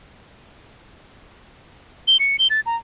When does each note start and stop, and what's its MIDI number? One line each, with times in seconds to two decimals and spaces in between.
2.07 2.17 103
2.19 2.37 97
2.39 2.48 103
2.50 2.61 93
2.66 2.76 82